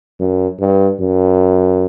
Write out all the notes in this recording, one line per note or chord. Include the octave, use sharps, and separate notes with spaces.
F#2
G2
F#2